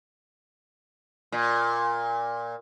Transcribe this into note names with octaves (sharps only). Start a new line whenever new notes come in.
A#2